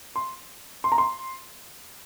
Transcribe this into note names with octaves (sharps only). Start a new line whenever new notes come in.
C6
C6
A#5
C6